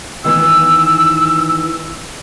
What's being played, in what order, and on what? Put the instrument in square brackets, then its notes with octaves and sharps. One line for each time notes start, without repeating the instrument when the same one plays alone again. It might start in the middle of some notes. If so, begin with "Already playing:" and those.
[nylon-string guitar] D#3 E3 B3 [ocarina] E6